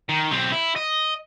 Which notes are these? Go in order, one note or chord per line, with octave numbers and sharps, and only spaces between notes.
D#3
B1 C4
E4
D#5